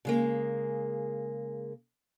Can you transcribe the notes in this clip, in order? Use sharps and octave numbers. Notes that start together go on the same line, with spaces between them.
C#3 G#3 A#3